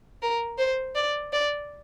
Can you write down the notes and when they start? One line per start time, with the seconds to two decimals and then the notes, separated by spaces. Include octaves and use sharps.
0.22 A#4
0.58 C5
0.95 D5
1.33 D5